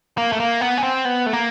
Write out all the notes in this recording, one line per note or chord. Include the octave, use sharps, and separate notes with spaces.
A#3
A3
A#3
B3
C#4
C4
B3
A3
A#3